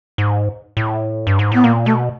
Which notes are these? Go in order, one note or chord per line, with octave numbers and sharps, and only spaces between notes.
G#2
A2
G2
G#2
A2 B3
A#2 A#3
B2 A3